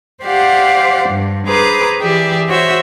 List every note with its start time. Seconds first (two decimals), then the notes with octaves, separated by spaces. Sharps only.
0.24 G4 C5 D5 F5 F#5
1.08 G2
1.46 G#4 B4 C5 A#5 D6 D#6
1.98 E3 G4 G#4 D5 E5
2.48 F#4 C5 C#5 E5